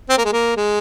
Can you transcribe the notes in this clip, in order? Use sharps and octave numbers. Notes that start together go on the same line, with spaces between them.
C4
A#3
G#3
A#3
G#3